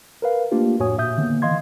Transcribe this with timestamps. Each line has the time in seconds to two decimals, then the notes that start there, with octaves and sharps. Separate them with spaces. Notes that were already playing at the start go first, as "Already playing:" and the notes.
0.22 A#4 B4 F5
0.52 A3 A#3 D4 F4 G4
0.79 F2 A2 F#4 C#5 G#5 D#6
0.98 A#2 E5 D#6 G6
1.17 D3 D#3 A#3 B3
1.42 E3 D#5 F5 C6 G#6